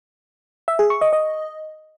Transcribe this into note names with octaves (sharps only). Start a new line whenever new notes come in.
E5
G#4
C#6
D#5
D#5